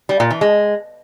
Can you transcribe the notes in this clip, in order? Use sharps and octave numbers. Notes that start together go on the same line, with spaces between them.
G3
A#2
E3
G#3